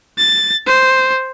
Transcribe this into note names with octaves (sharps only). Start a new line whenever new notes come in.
A6
C5